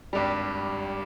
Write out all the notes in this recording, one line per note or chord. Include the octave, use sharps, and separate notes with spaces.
G#1 G2 G3